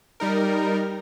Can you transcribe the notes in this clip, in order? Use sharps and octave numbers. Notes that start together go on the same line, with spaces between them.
G3 D#4 A#4